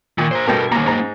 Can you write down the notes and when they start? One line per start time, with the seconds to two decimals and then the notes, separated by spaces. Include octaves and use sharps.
0.18 A#2 D#3
0.31 C5 A#5
0.47 G2 B2 A4 A#4 G5
0.72 D#2 A#3 C#4 A#5
0.86 G#2 A#5